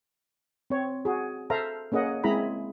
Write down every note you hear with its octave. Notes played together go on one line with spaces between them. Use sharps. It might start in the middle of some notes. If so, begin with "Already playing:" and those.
C4 C#5
F#4 G#4
A4 C5 E5 F5 A#5
A#3 C#4 G#4 D#5 F#5
G#3 C4 E4 G#4 A#5 B5